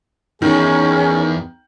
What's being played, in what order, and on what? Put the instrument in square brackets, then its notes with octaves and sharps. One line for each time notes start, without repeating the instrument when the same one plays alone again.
[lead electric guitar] E2 [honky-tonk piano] D#3 [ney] C#4 [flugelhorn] G#4